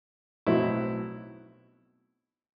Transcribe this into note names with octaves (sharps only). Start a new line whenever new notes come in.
B1 A2 F#3 C4 E4